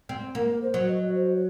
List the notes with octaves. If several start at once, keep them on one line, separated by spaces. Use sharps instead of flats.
C4
A#3 A#4
C5
F#3
D#5
C5
C#5